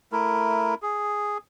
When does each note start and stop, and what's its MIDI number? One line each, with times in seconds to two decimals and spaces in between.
0.12 0.75 57
0.12 0.75 64
0.12 0.75 70
0.82 1.38 68